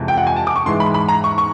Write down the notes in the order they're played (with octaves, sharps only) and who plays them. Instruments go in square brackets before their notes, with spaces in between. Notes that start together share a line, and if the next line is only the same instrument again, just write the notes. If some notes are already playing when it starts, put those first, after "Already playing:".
Already playing: [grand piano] F2 C3 E3 G#3
G5
F#5
G#5
A5
D6
C#6
G#2 E3 G#3 C6
B5
B5
A#5
C#6
C#6